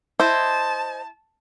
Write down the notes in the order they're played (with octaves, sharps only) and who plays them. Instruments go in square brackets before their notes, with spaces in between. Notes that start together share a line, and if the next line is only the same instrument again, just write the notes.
[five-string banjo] E4 [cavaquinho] C5 D#5 [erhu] A5